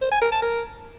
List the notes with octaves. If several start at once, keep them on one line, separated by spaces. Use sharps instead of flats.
C5
G#5
A#4
A5
A#4